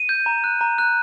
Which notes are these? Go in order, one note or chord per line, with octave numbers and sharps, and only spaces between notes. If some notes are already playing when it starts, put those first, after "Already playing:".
Already playing: D#7
G6
A#5
F#6
A#5
F#6